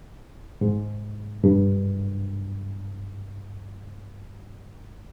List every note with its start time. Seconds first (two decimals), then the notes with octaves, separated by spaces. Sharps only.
0.61 G#2
1.44 G2